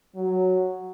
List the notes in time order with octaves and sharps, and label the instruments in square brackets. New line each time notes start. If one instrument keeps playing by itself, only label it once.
[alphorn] F#3